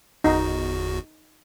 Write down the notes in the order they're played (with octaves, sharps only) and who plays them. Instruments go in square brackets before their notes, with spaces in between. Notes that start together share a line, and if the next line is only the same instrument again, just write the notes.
[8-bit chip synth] G1 E2 F#4 [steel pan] D#4